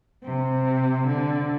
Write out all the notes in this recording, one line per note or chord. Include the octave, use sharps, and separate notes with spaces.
C3
D3